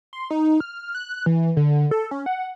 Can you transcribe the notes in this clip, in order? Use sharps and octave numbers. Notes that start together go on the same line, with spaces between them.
C6
D#4
F6
F#6
E3
D3
A4
C#4
F#5